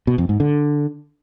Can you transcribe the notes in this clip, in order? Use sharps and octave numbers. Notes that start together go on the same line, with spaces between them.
B2
F2
G#2
D3